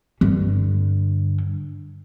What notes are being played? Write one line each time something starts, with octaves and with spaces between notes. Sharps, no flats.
G2 D3